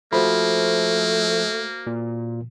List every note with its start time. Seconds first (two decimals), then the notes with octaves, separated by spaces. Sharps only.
0.13 F3 A3 A#3 F#4 C5 B5
1.87 A#2